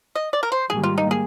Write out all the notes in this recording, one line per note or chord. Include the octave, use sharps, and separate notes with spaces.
D#5
D5
A#4
C5
G#2 D#3 G3 A#3 G#4
F4
D#4
G#4